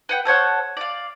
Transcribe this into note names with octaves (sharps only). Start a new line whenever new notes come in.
B4 F#5 G5
A4 C5 C#5 F#5
D5 F5